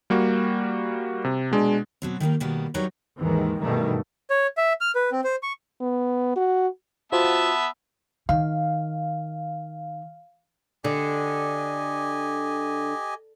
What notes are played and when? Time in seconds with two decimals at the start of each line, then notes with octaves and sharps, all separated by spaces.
0.10 G3 A#3 F#4
1.25 C3
1.51 B2 G#3 D4
2.02 B2 F#3 C4
2.20 D#3 G3 A#3 D#4
2.40 B2 D#3 G3 A#3 B3
2.74 F#3 G3 D#4 A#4 B4 C#5
3.18 D#2 G#2 D#3 E3 G#3
3.59 G2 B2 D#3 E3 G3 A3
4.30 C#5
4.57 E5
4.81 F6
4.95 B4
5.12 C4
5.24 C5
5.43 C#6
5.81 B3
6.36 F#4
7.12 B3 F4 F#4 C5 E5 A5
8.29 D#3 F5
10.84 D3 G4 D#5 G#5